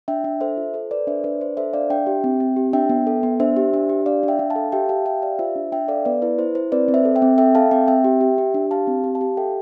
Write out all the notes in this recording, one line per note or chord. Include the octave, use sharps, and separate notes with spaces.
D4 E5 G5
D4
A4 C5 E5
F4
A4 C5
A4 B4 D5
D4 C5 E5
D4 B4 D5
D4 C5
A4 C5 E5
D4 D5 F5
D4 E5 G5
G4
C4
C4
G4
D4 E5 G5
B3
A4
B3
D4 C5 E5
G4
D4
G4
D4 D5 F5
D4
E5 G5
D4
F5 A5
A4
G4 E5 G5
G4 F5 A5
G4 E5 G5
G4 D5 F5
F4 C5 E5
D4
D4 E5 G5
A4 D5 F5
B3 B4 D5
E4 B4
E4 C5
E4 C5
C4 B4 D5
C4
C5 E5
A4
E5 G5
C4
A4 E5 G5
A4 F5 A5
C4 E5 G5
C4 E5 G5
G4
G4
G4
D4
G4 F5 A5
C4
G4
F5 A5
G4
A4 E5 G5